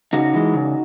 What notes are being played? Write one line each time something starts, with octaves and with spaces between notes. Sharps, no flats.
C#3 D#4 F#4
E3 G#3
C#3